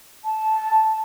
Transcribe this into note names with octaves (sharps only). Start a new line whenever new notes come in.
A5